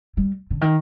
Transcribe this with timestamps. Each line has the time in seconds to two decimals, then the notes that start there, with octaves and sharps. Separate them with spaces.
0.17 G3
0.50 D3
0.61 D#3